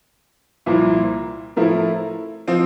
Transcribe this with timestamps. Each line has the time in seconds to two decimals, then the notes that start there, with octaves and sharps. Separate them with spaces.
0.66 C2 A#2 F3 A#3 E4
1.56 A2 F3 A3 E4 A#4
2.48 F3 C4